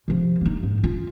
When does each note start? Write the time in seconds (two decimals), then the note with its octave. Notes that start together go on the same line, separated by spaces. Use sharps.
0.08 C3 F3
0.41 A#3 D#4
0.63 G#2
0.84 F4